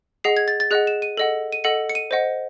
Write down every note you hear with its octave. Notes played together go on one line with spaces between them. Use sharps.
G#4 D#5 F#5 C7
G#6
A6
A6
G#4 D#5 F#5 F#6
E7
D#7
A4 D#5 F#5
D#7
A4 D#5 F#5 C#7
C#7
D#7
C5 D#5 F#5